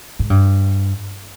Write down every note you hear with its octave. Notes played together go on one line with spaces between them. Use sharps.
G#2
G2